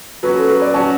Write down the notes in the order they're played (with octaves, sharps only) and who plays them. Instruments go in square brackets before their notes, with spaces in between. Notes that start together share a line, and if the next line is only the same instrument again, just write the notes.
[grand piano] F#3 C#4 F#4 [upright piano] B4
[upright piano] A4
B4
D5
[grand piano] F#3 C#4 F#4 [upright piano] A5